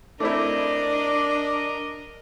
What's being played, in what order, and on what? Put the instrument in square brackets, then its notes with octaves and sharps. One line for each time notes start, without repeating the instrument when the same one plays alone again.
[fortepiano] A3 C4 E4 [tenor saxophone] D4 [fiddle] A#4 D#5 [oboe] D6
[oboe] D6